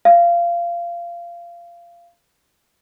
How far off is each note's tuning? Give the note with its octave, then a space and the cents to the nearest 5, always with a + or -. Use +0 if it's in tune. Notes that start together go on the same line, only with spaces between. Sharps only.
F5 -20